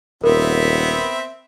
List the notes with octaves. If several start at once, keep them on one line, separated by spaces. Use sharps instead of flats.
D#1 B3 C4 A#4 E5